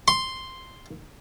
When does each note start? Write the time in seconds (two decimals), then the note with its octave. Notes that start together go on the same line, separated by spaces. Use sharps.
0.08 C6